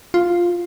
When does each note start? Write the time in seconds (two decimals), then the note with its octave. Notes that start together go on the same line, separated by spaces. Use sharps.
0.14 F4